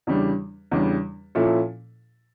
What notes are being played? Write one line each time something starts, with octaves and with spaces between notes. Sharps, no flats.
E2 C#3 G3 D4
E2 C#3 G3 D4
A#2 F3 C#4 E4 A4